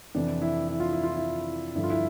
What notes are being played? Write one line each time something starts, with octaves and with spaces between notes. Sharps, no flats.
F2 C3 E3 D4
E4
E4
F4
E4
F4
E4
G2 D3 F3 E4
F4
E4